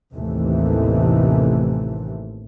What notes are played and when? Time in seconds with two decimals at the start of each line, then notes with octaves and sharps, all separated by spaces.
0.13 A1 D#2 C3 E3 A3